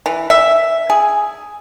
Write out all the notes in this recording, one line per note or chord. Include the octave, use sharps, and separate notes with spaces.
E3
E5
G#4